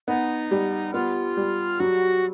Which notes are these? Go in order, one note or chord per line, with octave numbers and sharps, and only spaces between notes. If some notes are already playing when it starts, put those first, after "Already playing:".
B3 D#4
G3
B3 F4
G3
F#3 F#4